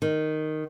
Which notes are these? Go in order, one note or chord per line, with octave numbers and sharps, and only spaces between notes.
D#3